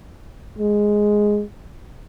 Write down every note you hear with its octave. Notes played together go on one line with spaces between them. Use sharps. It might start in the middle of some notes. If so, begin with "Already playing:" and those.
G#3